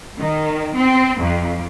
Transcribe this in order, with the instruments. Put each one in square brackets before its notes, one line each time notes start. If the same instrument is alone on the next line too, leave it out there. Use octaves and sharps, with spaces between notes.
[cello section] D#3
C4
F2